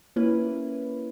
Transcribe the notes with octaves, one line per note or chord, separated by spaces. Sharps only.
A#3 C#4 E4 B4